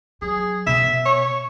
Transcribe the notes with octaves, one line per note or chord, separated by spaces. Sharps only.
F#3 G#4
B2 E5
C#5